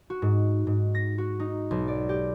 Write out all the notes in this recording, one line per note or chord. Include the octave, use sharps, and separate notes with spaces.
F#4
G#2
G#2
A#6
F#4
D#4
B1
D5
G4